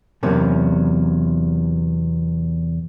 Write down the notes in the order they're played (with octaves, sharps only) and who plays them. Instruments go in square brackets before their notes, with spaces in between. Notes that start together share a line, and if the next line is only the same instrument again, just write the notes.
[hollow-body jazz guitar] E2 C3 F#3 A#3 C#4